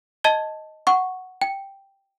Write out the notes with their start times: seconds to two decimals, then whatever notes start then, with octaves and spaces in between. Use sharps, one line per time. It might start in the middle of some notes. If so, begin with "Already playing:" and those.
0.24 D#5 A5 G#6 G7
0.87 F#5 C#6
1.42 G5